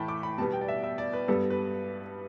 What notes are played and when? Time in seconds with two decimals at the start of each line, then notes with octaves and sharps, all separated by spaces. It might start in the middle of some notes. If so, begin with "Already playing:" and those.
Already playing: A2 E3 A3 G5 A5 B5
0.08 D6
0.23 B5
0.38 B2 G3 B3 A5
0.53 G5
0.61 D5
0.68 E5
0.83 E5
0.98 D5
1.13 B4
1.28 G2 G3 B3 A4
1.50 B4